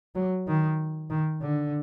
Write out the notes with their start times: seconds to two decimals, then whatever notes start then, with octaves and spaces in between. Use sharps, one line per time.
0.15 F#3
0.48 D#3
1.10 D#3
1.42 D3